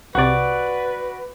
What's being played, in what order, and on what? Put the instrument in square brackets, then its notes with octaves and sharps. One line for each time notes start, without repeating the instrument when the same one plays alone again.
[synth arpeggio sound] C2 C3 [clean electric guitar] F#4 D5 [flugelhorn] B4